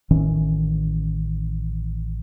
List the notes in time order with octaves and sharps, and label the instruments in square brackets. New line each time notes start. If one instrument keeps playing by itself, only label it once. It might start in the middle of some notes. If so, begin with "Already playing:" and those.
[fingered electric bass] A1 D#3 E3 C#4